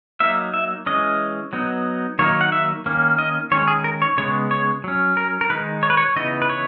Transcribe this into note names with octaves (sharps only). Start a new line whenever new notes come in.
F#3 A#3 D#4 E5
E5
E3 G#3 C#4 D#5
F#3 B3 D#4
D#3 F#3 A#3 D#4 C#5
F#5
E5
D#3 A#3 C#4
D#5
D#3 G#3 C#4 C#5
G#4
A#4
C#5
C#3 G#3 B3 C#5
C#5
F#3 C#4
A#4
A#4
D#3 G#3 D#4 B4
C#5
B4
C#5
C#3 E3 B3 D#4 D#5
B4
C#5